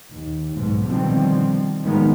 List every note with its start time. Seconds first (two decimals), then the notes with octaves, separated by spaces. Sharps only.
0.10 D#2
0.55 B1 G#2 B2
0.87 B2 D3 D#3 F3 G3 C4
1.84 A2 D#3 F3 F#3 G#3 B3